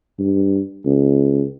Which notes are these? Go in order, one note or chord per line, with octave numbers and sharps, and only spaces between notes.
G2
C#2